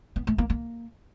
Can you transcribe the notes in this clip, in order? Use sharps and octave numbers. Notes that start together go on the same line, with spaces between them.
B3
A3
A#3
A#3